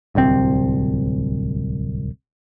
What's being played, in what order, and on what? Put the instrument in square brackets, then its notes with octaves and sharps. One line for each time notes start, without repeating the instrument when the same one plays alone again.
[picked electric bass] D1 C2 B2 C4